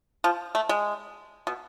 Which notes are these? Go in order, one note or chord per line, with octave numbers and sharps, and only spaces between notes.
F3
A3
G#3
B2